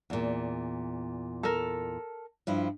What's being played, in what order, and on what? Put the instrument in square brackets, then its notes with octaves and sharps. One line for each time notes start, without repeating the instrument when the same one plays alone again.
[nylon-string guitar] E2 A#2
[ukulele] A4 A#4
[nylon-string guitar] G2 F3 E4